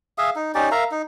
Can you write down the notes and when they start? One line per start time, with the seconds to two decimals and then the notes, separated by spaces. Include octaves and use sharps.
0.18 G#4 E5 F5 D#6
0.36 D#4
0.55 C#4 D#4 G4 D5
0.71 A#4 E5 F5 A#5
0.91 D#4